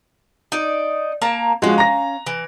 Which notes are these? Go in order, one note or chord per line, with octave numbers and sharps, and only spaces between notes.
D#4 D5
A#3 A5 A#5
F3 G#3 C#4 F#4 F5
A#5 A#6
E3